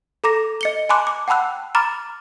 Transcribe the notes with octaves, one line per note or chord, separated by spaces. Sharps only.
A4 A#5 D6 A#6
D#5 C#7 G7
G#5 A5 B5 C6 D6 F#6
D6
F#5 G5 A5 B5 E6 F#6
A#5 B5 D6 F6 A6